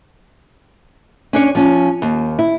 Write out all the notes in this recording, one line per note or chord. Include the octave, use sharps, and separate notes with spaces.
C#4 D4 C#5
F3 C#4
D#2
E4